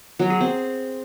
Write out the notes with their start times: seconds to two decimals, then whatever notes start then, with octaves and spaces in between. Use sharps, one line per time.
0.19 F#3
0.30 G#4
0.41 C4